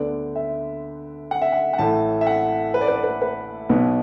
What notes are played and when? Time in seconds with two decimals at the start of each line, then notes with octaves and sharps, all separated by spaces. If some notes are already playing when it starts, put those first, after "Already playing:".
Already playing: D2 D3 B3 D5
0.36 E5
1.31 F#5
1.42 E5
1.52 F#5
1.73 F#5
1.78 A1 A2 A3 A5
2.21 E5
2.27 F#5
2.74 B4
2.81 D5
2.88 B4
2.96 D5
3.04 B4
3.22 B4
3.69 B1 B2 B3